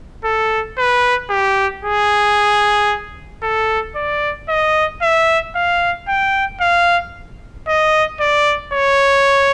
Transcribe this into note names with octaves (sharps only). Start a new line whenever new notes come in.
A4
B4
G4
G#4
A4
D5
D#5
E5
F5
G5
F5
D#5
D5
C#5